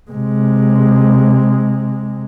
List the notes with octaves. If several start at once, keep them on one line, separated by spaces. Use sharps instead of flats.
C3 G#3